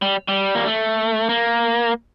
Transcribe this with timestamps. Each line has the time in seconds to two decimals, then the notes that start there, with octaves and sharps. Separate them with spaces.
0.02 G3
0.28 G3
0.55 A#3
0.66 A3
1.29 A#3